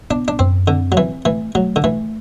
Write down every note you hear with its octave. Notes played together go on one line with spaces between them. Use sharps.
B3 D4
D4
F#2 C4
D3 C4
F#3
E3 C4
E3 A3
F#3 A3
D3
E3 A3